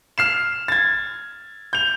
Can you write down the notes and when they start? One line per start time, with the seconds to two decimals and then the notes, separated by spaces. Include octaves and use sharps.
0.18 F6 C7 E7
0.68 G#6 A6
1.73 G6 F7